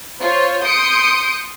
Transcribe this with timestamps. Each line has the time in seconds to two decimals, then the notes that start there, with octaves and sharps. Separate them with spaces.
0.21 F4 C5 C#5
0.65 C6 D#6 G6 C#7 D7